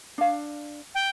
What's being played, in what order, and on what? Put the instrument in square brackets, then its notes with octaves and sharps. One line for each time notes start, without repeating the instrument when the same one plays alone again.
[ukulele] D4 F5
[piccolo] G5